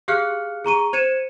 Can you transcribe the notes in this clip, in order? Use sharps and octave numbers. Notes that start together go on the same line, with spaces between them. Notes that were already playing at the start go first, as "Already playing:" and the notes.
G4 G#4 F5 F6 F#6 C#7
G#4 A#5 C#6 D#7
C5 G#6 C#7 D#7 E7